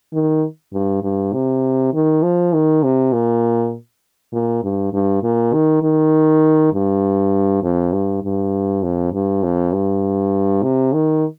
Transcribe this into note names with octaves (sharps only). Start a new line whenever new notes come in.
D#3
G2
G2
C3
D#3
F3
D#3
C3
A#2
A#2
G2
G2
A#2
D#3
D#3
G2
F2
G2
G2
F2
G2
F2
G2
C3
D#3